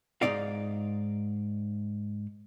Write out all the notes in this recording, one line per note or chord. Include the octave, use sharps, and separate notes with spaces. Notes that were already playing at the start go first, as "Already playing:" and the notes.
G#2 F3 D#4 D5 F5